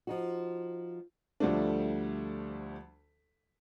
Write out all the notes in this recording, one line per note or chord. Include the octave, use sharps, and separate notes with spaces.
F3 D#4 F#4
D2 F3 G3 A3 D4